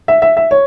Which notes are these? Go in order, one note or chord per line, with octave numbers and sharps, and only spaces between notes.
E5
E5
E5
C#5